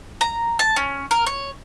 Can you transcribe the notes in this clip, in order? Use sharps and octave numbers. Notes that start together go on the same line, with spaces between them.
A#5
A5
C#4
A#4
C#5